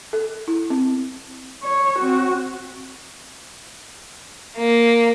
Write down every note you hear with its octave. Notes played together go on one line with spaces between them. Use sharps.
A4
E4
C4
C#5
C4 F#4
A#3